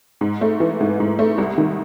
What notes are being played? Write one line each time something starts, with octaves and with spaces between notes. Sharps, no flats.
G#2
A3
E3
G#2
G#2
A3
C2
D#3